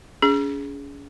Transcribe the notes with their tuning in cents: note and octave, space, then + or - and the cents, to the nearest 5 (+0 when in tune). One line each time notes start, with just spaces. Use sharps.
C#4 +40 G#4 +0